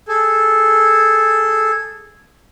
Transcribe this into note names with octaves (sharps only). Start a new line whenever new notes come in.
G#4 A4